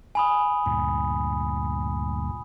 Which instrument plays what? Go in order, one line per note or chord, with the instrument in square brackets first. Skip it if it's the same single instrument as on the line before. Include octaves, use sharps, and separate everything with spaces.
[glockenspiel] G#5 B5 D#6
[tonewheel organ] D2 G2 A#2